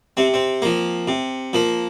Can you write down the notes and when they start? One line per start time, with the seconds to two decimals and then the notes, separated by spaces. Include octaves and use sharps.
0.17 C3 C4
0.34 C4
0.62 F3 A#3
1.08 C3
1.53 F3 A#3